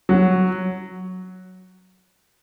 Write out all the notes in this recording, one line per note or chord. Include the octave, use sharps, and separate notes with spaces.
F#3